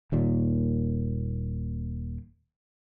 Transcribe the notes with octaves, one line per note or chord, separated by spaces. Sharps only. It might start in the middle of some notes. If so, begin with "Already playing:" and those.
D#1 D#2 A#2